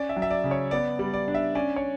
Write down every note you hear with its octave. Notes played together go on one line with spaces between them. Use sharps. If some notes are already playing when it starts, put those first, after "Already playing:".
Already playing: C#4 D5
E5
F#3
E5
D5
C#3
C#5
B3 D5
G3
D5
D4
E5
C#4 D5
C#5